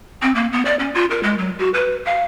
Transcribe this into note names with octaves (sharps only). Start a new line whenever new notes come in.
C4
A#3
B3
D5
C#4
F4
A#4
G#3
F#3
F#4
B4
F5